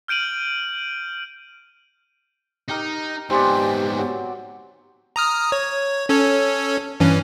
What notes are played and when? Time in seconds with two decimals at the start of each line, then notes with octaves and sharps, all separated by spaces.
0.08 F6 G6 D7 D#7 F#7
2.69 D#4 G4 A#4
3.30 G#2 B3 C4 G4 C5 D5 G#5
3.98 F#3
5.16 A#5 D#6 F6
5.52 C#5
6.09 C#4 A4 C#5
7.00 G2 E3 C#4